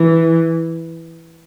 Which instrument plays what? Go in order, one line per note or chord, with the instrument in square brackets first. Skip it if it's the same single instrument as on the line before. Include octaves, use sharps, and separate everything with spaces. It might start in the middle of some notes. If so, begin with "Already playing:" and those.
Already playing: [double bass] E3